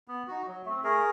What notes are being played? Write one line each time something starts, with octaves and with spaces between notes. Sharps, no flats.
B3
D#4 F#4
F#3
A3 C4
A3 G#4 A#4